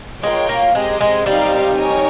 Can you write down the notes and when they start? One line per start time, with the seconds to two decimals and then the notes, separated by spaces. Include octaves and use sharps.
0.23 G#3 F4 A#4 C#5 G5
0.49 A#3
0.74 G#3 C4 G4 A#4 D#5
1.01 G#3
1.26 G3 C4 D#4 G4 A#4 F5
1.78 D#4 A#4 C#5 G#5